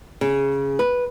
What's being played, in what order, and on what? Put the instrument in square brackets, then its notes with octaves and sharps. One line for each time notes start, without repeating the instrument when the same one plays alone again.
[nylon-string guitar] C#3
B4